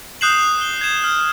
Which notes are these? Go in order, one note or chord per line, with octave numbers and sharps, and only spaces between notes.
D#6 F#6 G6 C7 E7 F#7
F#6 G7
G#6 E7
F6